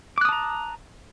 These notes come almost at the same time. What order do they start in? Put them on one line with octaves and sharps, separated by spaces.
D6 F#6 D#6 A5 A#5